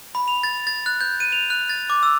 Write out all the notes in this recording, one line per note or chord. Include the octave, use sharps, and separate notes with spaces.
B5
F7
A6
A6
F#6
G6
D#7
F7
F#6
A6
D6
E6